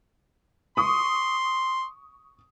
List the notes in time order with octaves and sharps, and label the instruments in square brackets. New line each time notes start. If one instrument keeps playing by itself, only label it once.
[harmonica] C6 [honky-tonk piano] C#6 D#6